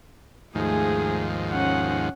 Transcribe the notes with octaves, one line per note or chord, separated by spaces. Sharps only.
D#2 G#2 F3 A3 G#4
C#4 F#5